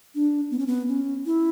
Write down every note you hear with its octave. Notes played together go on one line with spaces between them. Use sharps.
D4
B3
C#4
B3
C#4
E4